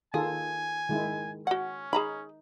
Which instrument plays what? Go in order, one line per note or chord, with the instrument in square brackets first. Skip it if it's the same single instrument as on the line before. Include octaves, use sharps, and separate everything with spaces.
[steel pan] D#3 F4 A4 [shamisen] G#4 [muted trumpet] G#5
[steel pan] D#3 G#3 E4
[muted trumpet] C#4 [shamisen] F#4 F#5
[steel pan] D#4 [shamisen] G#4 A#5 B5